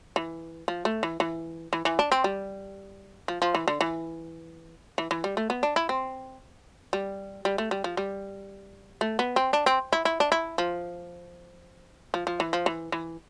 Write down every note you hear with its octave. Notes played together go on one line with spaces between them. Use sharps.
E3
F3
A3
E3
E3
E3
E3
D4
C4
G3
F3
F3
E3
D3
E3
E3
E3
G3
A3
B3
D4
E4
C4
G3
G3
A3
G3
F3
G3
A3
B3
C4
D4
C4
E4
E4
D4
E4
F3
F3
F3
E3
F3
E3
E3